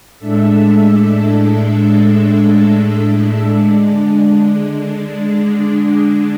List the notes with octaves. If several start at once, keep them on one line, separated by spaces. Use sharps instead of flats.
A2 G#3 D4 A4 E5
D3 G#3 D4